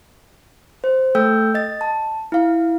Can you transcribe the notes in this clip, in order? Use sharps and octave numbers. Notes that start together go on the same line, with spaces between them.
C5
A3 A4 G5 E6 G6
D#5 A6
A5
E4 F5